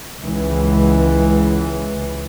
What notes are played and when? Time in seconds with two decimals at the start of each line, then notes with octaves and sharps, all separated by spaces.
0.23 C#2 E3